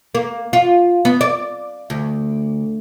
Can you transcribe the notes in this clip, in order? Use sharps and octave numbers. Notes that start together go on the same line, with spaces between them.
A#3
F4
B3
D5
D2